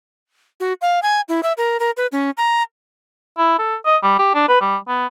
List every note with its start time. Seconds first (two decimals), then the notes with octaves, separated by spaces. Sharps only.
0.60 F#4
0.81 F5
1.03 G#5
1.28 E4
1.43 E5
1.57 A#4
1.80 A#4
1.97 B4
2.12 C#4
2.37 A#5
3.38 E4
3.59 A4
3.86 D#5
4.03 G3
4.19 G4
4.35 D4
4.48 B4
4.61 G3
4.88 B3